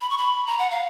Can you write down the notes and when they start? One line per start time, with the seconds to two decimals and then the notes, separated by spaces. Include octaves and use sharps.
0.01 B5
0.10 C#6
0.18 B5
0.47 A#5
0.59 F#5
0.71 F5